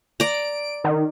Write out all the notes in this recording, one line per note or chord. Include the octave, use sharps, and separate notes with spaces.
D5 A#5 D7
D#3